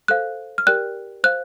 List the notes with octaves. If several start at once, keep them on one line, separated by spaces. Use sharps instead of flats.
A4 C5 F5 F#6
F6
G4 A#4 D5 G5 F#6
C5 F5 F#6